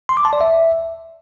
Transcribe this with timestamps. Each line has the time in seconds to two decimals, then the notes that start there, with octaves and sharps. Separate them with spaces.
0.09 C6
0.17 D6
0.25 A5
0.33 D5
0.41 E5